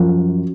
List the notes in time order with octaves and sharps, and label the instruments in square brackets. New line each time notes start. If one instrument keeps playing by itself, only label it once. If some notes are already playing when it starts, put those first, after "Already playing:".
Already playing: [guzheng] F#2 [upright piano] F3